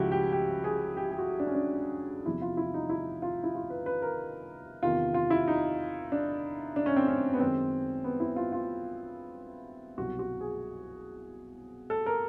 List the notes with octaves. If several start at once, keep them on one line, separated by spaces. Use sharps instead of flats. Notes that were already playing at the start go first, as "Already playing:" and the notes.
Already playing: C#2 C#3 F3 G#3 E4 F#4 G4
G4
G4
G#4
G4
G4
F#4
D4
C#4
D4
E2 C3 F3 E4
F4
E4
D#4
E4
F4
E4
F4
B4
B4
A#4
E2 C3 D#3 F4
F4
E4
D#4
D4
D4
C#4
C4
C#4
B3
F#2 D#3 G#3 C4
B3
E4
F4
F4
C2 B2 F#3 F#4
F#4
G#4
A4
A#4